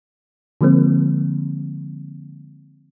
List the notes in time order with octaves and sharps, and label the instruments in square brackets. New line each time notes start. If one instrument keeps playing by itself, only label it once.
[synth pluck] D3 F3 G#3 A#3 C4